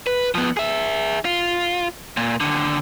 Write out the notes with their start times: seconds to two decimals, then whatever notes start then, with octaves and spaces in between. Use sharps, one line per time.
0.07 B4
0.35 F3 B3
0.57 G#4 E5
1.25 F4
2.17 A#2
2.40 D#2 D3